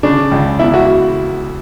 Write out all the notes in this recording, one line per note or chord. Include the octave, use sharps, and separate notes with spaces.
C#3 D4
C#2
E2 E4
F#4